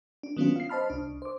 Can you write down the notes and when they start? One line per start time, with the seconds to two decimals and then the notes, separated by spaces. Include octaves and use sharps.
0.23 D4
0.37 D#3 F#3 B3 C#4 D4 F4
0.56 F5 C7
0.69 C5 D#5 A5 B5 F6
0.90 C2 D4
1.22 C5 D6